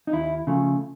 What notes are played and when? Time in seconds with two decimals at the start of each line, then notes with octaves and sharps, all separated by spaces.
0.07 D#4
0.13 D#2 E4
0.47 C#3 F3 A3